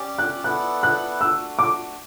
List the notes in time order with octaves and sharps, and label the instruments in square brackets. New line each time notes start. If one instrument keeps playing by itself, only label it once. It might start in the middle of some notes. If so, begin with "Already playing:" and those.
Already playing: [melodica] C#4 G4 D5
[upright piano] F#6
[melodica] B3 E4 A4 D5 [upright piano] F#6
[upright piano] F#6
[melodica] A3 D4 F#4 [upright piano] E6
[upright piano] D6